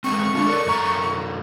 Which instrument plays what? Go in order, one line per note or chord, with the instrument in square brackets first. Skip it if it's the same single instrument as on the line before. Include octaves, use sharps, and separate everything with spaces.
[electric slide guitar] G#3 A3 C4 [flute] C#6
[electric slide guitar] G#3 D4 F4
A4 A#4 D5
F#2 A3 A#5